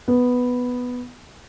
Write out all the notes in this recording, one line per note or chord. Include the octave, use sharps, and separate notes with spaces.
B3